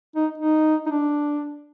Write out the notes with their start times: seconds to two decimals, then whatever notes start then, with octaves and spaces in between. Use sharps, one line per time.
0.16 D#4
0.38 D#4
0.86 D#4
0.91 D4